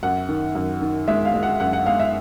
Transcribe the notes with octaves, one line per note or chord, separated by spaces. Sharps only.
F#2 F#5
D#3
F#2
D#3
G#3 E5
F5
G#3
F#5
F#2 F#5
F#5
G#3 F5
E5